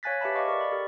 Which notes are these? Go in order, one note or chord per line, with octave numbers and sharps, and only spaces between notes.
C#5 F5 G#5 F#6 A6 B6
G4 B4 E5 A5 B5
D#5 F5 C#6 D6
G#4 A#4 D5 C#6
D5 B5
G4 A4 A#4